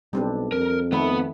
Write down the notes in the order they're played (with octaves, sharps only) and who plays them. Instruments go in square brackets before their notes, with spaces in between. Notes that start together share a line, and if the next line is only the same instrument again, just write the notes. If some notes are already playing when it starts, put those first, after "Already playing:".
[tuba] B1 [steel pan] G3 C4 D4
[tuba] F2 [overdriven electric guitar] A#4
[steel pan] D#3 A3 [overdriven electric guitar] B3 B5